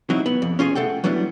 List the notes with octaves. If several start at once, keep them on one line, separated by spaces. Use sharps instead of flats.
F#3 C4 D#4 E4
B3
F2
C#4 F4 G#4 C#5
A3 A4 F#5 G5
F#3 G3 B3 D4 E4